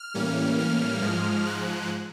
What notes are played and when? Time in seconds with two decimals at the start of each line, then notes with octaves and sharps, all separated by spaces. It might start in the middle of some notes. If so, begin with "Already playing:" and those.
Already playing: F6
0.14 A2 E3 G3 A#3 C#4
0.59 F6
1.02 G#2 F3 G#3
1.46 F#6